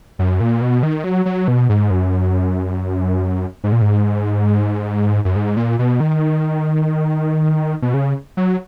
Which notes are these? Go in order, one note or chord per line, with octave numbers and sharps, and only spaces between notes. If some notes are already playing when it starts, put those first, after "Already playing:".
F#2
A#2
B2
D#3
F#3
F#3
B2
G#2
F#2
G#2
A#2
G#2
F#2
G#2
A#2
B2
D#3
B2
C#3
F#3